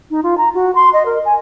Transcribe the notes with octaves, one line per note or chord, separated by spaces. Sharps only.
D#4
F4
A#5
F#4
C6
D#5
A#4
G#5